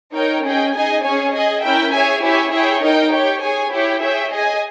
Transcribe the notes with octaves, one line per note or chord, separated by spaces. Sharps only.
D#4 A#4 C#5 G5
C#4 G#4 D#5 G5
D#4 G#4 D#5 G#5
C#4 G#4 C#5 G#5
G#4 D#5 G#5
C#4 E4 A#4 E5 G5
G#4 C#5 E5 G#5
E4 G4 C#5 E5 G#5
E4 G#4 C#5 E5 G5
D#4 A#4 D#5 G5
G4 C#5 G5
G#4 C#5 G#5
E4 G4 C#5 G5
G#4 C#5 E5 G5
G#4 D#5 G#5